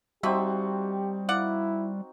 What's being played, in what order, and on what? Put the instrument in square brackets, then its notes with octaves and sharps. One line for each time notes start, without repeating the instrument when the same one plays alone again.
[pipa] F3 E5 [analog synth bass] G3 [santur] C4 D#4 F#4 [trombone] G4
[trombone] E4 [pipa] D5 F5 F#5